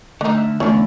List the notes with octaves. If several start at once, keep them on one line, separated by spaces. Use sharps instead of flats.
D3 A3 D4 D#4 F6
E5
E2 A3 C#4 D4 F4 C#5 B5